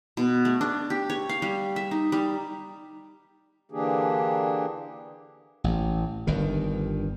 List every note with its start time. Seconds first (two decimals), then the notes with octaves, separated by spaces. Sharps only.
0.17 B2
0.45 A3
0.61 D4
0.90 G4
1.10 C#5
1.29 F5
1.42 G3
1.76 E5
1.91 D#4
2.12 G3
3.72 D3 E3 A#3 D4 G4 G#4
5.64 A1
6.27 G1 G2 D#3